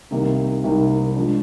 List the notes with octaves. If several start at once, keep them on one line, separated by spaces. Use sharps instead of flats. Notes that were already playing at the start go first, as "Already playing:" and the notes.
C2 C3 D#3 A#3 D#4
C2 C3 D#3 A#3 D#4
F3 G#3 D4